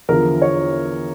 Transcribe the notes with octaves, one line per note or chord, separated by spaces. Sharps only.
E2 D3 F3 A#4
C#5